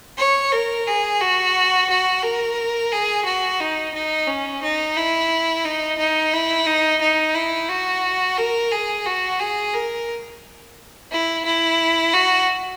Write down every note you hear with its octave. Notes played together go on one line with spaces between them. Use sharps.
C#5
A#4
G#4
F#4
F#4
A#4
G#4
F#4
D#4
D#4
C#4
D#4
E4
D#4
D#4
E4
D#4
D#4
E4
F#4
A#4
G#4
F#4
G#4
A#4
E4
E4
F#4